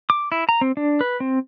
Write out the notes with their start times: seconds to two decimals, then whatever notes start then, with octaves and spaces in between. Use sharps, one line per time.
0.10 D6
0.32 E4
0.49 A#5
0.61 C4
0.77 D4
1.01 B4
1.20 C4